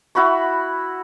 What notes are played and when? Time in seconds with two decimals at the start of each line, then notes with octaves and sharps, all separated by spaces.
0.15 E4 F#4 B5 C#6